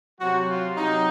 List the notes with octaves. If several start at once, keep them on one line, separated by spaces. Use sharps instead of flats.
C3 F#3 F#4
F4
C3 F#3 D#4